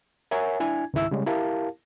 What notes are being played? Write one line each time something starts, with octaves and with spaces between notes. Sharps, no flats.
A#4 C#5 E5 F#5 G#5
D4 E4 G#5 G#6
C#2 G#2 D#3 E4 E5 E6
C#3 G3 G#3 C#4
E4 G4 A#4 F5 A5